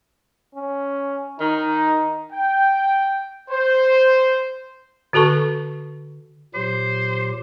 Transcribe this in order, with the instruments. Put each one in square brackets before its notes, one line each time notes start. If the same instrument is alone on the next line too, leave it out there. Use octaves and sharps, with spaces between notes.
[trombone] C#4
[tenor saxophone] D#3 [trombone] D#4
[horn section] G5
C5
[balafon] D3 F#4 A4 A5 C#6
[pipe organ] A#2 F#3 G4 [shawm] C5